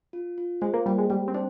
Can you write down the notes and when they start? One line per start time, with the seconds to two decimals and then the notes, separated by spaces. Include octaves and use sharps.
0.13 F4
0.38 F4
0.62 G#3 C5
0.74 A#3
0.86 G3 G5
0.98 G#3
1.10 G3 G5
1.28 C4
1.34 D4 C5